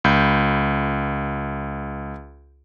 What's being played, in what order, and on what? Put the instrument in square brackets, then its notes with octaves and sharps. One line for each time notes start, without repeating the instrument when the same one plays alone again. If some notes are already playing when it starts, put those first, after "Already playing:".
[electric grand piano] C#2 B5 G6